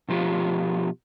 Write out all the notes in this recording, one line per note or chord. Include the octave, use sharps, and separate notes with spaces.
B2 F3 F4 G4